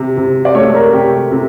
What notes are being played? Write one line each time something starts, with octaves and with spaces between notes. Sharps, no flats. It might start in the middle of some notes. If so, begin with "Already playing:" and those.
Already playing: C3
C3
D5
A3 C#5
A4
A#4
C3 G4
C3